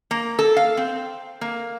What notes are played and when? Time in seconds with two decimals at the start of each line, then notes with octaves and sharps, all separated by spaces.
0.11 A#3
0.39 A4
0.57 F5
0.77 C4
1.41 A#3